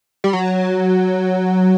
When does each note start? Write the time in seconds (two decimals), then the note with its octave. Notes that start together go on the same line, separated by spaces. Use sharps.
0.24 G3
0.33 F#3